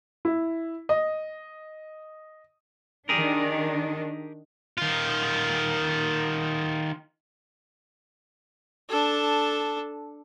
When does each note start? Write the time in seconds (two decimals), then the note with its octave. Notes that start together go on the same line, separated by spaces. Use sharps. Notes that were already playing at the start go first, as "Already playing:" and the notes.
0.25 E4
0.89 D#5
3.09 D#3 D4 G4 G#4 A#4
4.78 D#3 F4
8.89 D4 A4